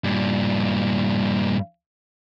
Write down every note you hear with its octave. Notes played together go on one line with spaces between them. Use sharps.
G2 A#2